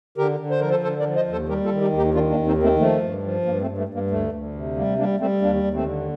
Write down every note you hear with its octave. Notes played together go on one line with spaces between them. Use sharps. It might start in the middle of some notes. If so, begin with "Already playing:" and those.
D3 G4 A#4
D3
C5
F3 A#4
A4 C5
D3 A4 C5
A#4 D5
F3
C5 D#5
D#2
A4 C5
G3 G4 A#4
F4 A4
D#3
D#4 G4
D#2
D#4 G4
D#3 D4 F4
A#3 D4
D#2
C4 D#4
D#3
A3 C4
F3 A3
G2
F3
G2 A#3
A3 C4
G2
A3
G2
A#3
D2 A3
D2
C3
G3 A#3
G3 A#3 D4
G3 A3 C4
D#2 A#3 D4
D#2
A3 C4
D3